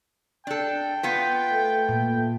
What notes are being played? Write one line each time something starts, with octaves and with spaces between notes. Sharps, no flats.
D4 A4 G5
B3 F4 B4
A3
A#2